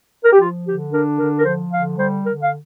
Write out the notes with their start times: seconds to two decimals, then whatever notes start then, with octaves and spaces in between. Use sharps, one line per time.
0.25 A#4
0.33 G4
0.40 F3 F4
0.67 D3 G4
0.93 D4 A#4
1.19 D3 A#4
1.39 A#4
1.45 F3 C5
1.72 D3 F5
1.98 G3 C5
2.25 D3 A#4
2.42 F5